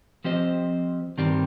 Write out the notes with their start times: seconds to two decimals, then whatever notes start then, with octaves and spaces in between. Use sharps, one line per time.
0.24 F3 C4 G4 C5 D#5
1.18 G2 D#3 G3 C4 G4